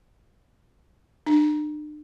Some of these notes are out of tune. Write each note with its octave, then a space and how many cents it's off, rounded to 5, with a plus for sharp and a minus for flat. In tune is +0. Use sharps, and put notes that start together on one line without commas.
D4 +40